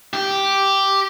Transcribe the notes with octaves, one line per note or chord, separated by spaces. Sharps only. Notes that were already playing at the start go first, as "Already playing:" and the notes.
G4